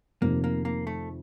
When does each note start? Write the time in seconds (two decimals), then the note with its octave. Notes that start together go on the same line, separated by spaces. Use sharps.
0.21 F1 F2 C3 D#3 A#3
0.44 A#3
0.65 A#3
0.87 A3